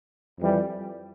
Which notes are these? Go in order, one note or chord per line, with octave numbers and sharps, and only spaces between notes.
F2 E3 G3